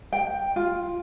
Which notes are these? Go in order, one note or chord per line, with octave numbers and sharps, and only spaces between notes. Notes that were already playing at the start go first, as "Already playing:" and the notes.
G5
F4